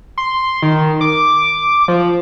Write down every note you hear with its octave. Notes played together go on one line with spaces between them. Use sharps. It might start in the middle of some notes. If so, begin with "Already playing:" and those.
C6
D#3
D6
F3